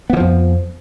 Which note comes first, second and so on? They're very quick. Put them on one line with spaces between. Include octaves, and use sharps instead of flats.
B3 E3 F3 F2